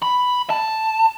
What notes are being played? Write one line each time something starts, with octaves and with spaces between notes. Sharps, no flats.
B5
A5